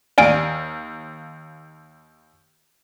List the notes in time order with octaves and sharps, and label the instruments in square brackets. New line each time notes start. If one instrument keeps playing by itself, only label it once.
[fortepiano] D#2 F5 [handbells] D5 G#5 D7